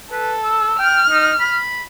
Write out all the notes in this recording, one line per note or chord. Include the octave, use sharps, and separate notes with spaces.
A4 B4
E6
G5 F6
D#4
B5